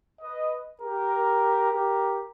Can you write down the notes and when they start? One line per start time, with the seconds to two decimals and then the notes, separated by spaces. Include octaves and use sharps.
0.22 B4 D#5
0.82 G4 A#4
1.72 G4 A#4